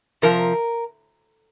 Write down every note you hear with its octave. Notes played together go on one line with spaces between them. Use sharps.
C3 F3 A#4